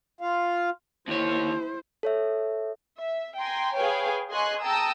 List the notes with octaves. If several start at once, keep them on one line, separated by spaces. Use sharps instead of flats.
F4 F5
D#2 E4 C5 C#5
A4 C#5 E5
E5
G5 G#5 A#5 C6
G#4 B4 C#5 F5 G5 G#5
G#4 D#5 G#5 C6 C#6 F#6
G5 A5 A#5 D#6 E6